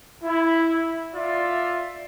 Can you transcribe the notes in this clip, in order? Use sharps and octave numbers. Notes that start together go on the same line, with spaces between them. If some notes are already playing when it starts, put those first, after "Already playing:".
E4
F4 D5 E5